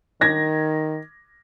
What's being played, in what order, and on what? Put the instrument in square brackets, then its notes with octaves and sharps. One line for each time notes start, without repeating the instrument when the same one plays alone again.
[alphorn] D#3 [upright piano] G#6 A#6